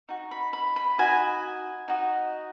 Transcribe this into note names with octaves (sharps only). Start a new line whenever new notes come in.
D#4 F#4
B5
B5
B5
D#4 F#4 D#5 G#5
D#4 F#4 D#5